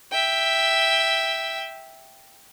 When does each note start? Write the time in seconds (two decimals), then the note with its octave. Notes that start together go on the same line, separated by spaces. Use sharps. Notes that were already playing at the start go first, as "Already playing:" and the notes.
0.12 E5 G5